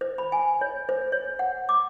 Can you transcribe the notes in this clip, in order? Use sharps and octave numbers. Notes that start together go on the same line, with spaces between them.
C5
B5
G#5
C#5
C5
C#5
F#5
D6